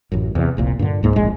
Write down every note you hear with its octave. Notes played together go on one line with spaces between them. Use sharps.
A1 F#2
E2 C3
F1 C2 A#2
G2 A#2 D3
C#2 G#2 A#3
D1 A#1 G#3